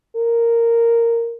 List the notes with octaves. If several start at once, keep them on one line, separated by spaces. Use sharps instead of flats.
A#4